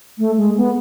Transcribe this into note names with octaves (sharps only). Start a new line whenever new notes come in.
A3
G#3
B3